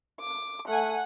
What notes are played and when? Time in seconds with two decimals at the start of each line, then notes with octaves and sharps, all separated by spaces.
0.20 D6
0.68 A3 F#5 G#5